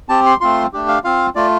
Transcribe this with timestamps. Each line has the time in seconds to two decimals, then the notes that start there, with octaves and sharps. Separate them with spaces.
0.09 C4 G4 A5
0.26 C6
0.41 A3 C4 F4 C6
0.73 A3 D4 G4
0.88 F5
1.04 C4 F4 F5
1.35 A3 F4 D5